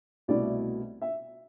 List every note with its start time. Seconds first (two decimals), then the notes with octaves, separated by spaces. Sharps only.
0.28 C2 B2 A3 E4 D5
1.02 E5